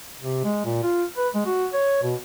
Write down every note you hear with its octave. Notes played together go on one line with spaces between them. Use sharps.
C3
G#3
A#2
F4
B4
G#3
F#4
C#5
B2